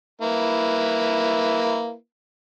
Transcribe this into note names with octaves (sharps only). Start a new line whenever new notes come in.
A#3 E4 B4